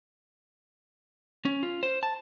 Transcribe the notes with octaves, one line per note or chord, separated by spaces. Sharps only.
C#4
F4
C5
A5